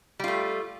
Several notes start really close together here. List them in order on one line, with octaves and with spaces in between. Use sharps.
G3 F4 A3